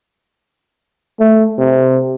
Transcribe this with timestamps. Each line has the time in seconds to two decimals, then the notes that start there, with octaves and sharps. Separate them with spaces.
1.20 A3
1.58 C3